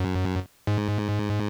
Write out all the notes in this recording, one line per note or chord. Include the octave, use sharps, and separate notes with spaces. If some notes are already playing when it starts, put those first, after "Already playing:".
Already playing: F#2
G#2